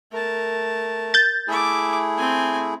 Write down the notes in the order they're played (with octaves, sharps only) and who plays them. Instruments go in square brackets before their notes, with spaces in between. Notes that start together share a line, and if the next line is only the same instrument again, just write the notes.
[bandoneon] A3 [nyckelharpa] A#4 A5
[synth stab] G6 A6
[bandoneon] A3 E4 G#4 [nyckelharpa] E5 D6
[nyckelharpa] C4 G#5